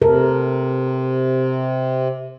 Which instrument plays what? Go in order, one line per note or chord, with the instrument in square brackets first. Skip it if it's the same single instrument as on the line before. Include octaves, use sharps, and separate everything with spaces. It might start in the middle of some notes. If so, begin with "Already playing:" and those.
[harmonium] C3 [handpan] A4 A#4